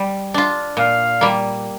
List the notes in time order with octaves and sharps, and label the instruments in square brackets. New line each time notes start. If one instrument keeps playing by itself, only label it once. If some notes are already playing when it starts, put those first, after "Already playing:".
Already playing: [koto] G3
D4 F4
[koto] A#2 [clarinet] F5
[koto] G3 A#3